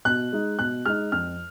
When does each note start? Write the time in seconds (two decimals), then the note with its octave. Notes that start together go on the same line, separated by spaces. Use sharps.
0.05 B2 F#6
0.32 G#3 D#4
0.59 B2 F#6
0.86 G#3 D#4 F6
1.12 F2 F6